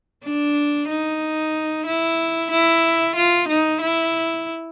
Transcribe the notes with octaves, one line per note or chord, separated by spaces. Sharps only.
D4
D#4
E4
E4
F4
D#4
E4